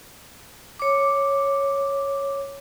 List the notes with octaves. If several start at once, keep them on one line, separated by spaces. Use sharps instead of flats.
C#5 D6